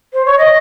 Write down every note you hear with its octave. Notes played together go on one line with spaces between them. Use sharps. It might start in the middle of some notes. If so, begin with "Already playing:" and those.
C5
C#5
D#5